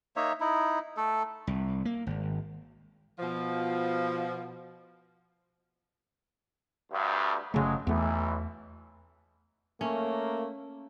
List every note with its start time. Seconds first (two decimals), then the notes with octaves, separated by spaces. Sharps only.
0.16 A#3 D#4 C#5 E5
0.40 D#4 E4
0.97 A3 A4
1.47 C2
1.85 A#3
2.07 G#1
3.19 B2 F3
6.92 D2 G2
7.54 F#1 C#3 F3 F#3 G#3 A3
7.87 B1 E2 E3 A3
9.81 A3 A#3 C#4